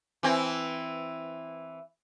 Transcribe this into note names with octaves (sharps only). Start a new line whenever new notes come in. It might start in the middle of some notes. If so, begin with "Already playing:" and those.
E3 C4 E4